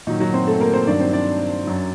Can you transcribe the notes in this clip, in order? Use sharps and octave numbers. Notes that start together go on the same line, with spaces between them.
A#2 D#3 F#3 D#4
F#3 F#4
C4 C5
A3 A4
A#3 A#4
C4 C5
G2 D#3 F#3 D4 D5
C4 C5
D4 D5
F#2 F#3